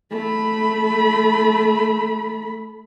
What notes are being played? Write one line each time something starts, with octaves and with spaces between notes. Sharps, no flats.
A3 B5